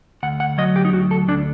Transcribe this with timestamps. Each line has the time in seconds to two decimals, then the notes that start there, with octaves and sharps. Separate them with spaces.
0.23 D2 F#5
0.40 F#5
0.58 F#3 D#5
0.76 G4
0.85 D#4
0.93 D2 F#4
1.11 A4
1.28 D2 D4